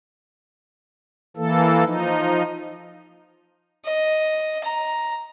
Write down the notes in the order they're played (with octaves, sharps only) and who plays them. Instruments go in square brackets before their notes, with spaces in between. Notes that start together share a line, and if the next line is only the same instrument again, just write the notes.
[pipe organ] E3 A#3 A4
F3 D#4
[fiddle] D#5
A#5